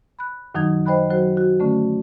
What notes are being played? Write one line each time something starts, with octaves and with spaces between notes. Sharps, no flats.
B5 F#6
F#2 D#3 F#3 D#4 D#6 G#6
C5 D#5 G5 B5 F#6
F#3 F#4 C5
F#4
D3 A3 C#4